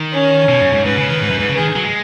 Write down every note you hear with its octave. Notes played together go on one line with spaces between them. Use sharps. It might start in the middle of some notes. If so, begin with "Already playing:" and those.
Already playing: D#3
C#4
B2
F#2
G#2
G#2 B4
C#3
D#3
G#2
F#2
G#2
C#3
D#3 G#4
F#3
G#3